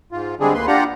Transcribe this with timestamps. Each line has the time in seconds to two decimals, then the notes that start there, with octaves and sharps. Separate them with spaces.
0.12 G#2 F4
0.40 D3 G3 G#3 C4 D4 G#4
0.54 D2 A#3 B4 C6
0.67 D4 F4 G4 F#5 A#5